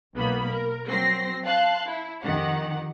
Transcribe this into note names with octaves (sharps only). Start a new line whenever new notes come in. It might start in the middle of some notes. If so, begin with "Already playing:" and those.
B1 A#3 B3 B5
A#4
F#3 C4 A#6 C7
F5 A5 C6 F#6
E4
F2 D#3 G4 F#5